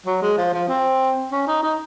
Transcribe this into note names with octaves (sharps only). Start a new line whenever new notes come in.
F#3
G#3
F3
F3
C4
C#4
D#4
D#4